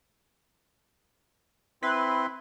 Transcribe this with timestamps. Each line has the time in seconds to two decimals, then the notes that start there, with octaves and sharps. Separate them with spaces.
1.83 C4 E4 B4 C6